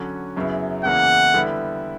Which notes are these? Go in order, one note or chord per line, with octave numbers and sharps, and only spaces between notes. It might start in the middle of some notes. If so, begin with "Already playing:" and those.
Already playing: D3 F#3 C#4
F#2 C#3 F#3 B3 E4
E2 C#3 E3 A#3 E4 F#5
D3 G3 B3 E4